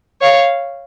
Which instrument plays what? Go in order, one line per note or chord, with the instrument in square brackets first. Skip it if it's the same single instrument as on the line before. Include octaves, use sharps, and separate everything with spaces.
[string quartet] C#5 F5